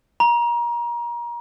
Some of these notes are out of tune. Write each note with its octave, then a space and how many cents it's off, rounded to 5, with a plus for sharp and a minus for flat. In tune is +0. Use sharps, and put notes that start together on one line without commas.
A#5 +30